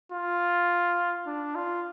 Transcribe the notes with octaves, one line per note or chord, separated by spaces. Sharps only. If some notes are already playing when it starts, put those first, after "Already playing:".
F4
D4
F4